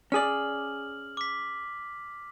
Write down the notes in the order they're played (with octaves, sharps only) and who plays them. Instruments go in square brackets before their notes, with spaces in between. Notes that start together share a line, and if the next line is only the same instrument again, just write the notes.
[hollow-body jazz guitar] C#4 G#4 D5 [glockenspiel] F6 F#7
[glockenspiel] D6 B6